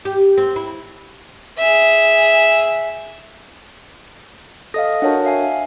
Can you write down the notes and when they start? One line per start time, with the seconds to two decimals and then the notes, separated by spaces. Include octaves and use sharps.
0.05 G4
0.38 C4
0.56 E4
1.58 G#4 E5
4.74 A4 D#5 F5 D#6 A#6
5.02 D4 F#4 A#4 C#5 F#5 A5
5.25 E5 F5 G#5